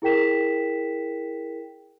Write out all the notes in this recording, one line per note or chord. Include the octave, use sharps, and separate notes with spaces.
E4 G#4 A#4 G5 B6 E7